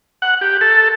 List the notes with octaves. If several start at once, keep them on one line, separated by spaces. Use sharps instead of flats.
F#5
G4
A4